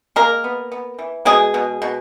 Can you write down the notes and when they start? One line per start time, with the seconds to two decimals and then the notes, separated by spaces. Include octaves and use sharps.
0.16 G#3 A#3 A#4
0.44 B3
0.72 B3
0.99 E3
1.25 B2 G#3 G#4
1.54 B2
1.82 B2